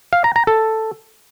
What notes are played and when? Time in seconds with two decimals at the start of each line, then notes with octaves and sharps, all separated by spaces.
0.13 F5
0.24 A#5
0.36 A#5
0.47 A4